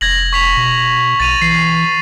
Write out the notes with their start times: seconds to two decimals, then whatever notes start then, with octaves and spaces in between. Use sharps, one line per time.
0.01 F1 G#6 A#6 F#7
0.33 C#6 B6 F7
0.57 B2
1.20 B1 A6 D#7 F7
1.42 E3 C7